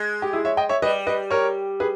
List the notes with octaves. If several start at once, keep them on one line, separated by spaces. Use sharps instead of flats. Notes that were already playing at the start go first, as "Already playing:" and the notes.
Already playing: G#3
G4
E4 G#4
C#5 E5
D#5 G5
C#5 E5
G3 B4 D#5
B4 D#5
A#4 C#5
G#4 B4